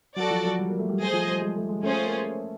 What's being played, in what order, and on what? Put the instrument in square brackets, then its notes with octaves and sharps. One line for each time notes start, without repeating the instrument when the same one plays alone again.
[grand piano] F#3 [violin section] F#4 A4 D5
[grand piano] F3
F#3
G3
A#3
A3
G3
[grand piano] A3 [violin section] G#4 C5 D#5
[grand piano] F3
G3
G#3
A3
G#3
[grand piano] A3 [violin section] C#4 F4 G#4 C5
[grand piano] A#3